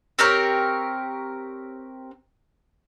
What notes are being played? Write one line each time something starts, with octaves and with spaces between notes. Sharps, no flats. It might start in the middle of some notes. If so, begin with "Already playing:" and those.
C4 G4 A#4 C#5